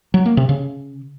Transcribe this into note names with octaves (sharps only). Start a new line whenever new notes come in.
F#3
A#3
C3
C#3